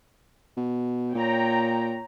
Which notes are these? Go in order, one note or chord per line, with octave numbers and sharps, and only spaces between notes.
B2
A#2 C#5 G5 A#5